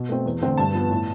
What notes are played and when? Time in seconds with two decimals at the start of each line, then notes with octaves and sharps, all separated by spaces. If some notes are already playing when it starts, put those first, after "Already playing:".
Already playing: B2
0.09 A3 C4
0.26 E2
0.41 D3 A3 C4
0.57 G2 A5
0.74 F3 B3
0.90 A2